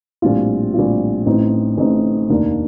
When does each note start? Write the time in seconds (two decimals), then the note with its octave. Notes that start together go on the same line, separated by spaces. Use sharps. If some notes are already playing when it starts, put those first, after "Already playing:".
0.22 A#1 A2 G3 C4 F4
0.74 A#1 A2 G3 C4 F4
1.26 A1 A2 A3 C4 D#4
1.77 A1 A2 A3 C4 D#4
2.29 F1 D#2 D#3 A#3 D4